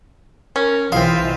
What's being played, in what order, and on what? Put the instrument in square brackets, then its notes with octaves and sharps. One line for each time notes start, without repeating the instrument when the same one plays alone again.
[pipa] C#4 [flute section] A#4
[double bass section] B1 E3 [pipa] G#3 C4 [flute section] E4 F4 C5 [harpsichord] F5